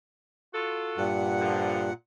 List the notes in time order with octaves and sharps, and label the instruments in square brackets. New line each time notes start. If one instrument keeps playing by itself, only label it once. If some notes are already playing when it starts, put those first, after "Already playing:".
[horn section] F4 F#4 A4
[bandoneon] G2 [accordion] A#2 F#5
[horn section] D3 F3